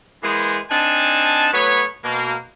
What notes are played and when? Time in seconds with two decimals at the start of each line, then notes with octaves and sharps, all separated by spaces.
0.24 E3 G#3 A#3 B3 G#4 C5
0.71 C4 D4 D#4 G#5 A5
1.53 F#3 A3 B3 B4 C#5
2.04 B2 A#3